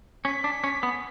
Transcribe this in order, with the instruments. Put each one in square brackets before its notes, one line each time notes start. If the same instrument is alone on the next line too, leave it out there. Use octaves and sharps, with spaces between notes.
[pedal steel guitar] C#4 [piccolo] B6
[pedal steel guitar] D4
C#4
B3